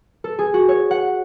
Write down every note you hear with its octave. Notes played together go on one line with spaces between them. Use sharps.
A4
G#4
F#4
C#5
F#5